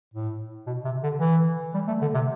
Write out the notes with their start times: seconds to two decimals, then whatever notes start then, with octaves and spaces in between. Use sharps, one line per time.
0.14 A2
0.67 B2
0.85 C3
1.03 D3
1.20 E3
1.74 G3
1.88 A3
2.02 D3
2.14 C3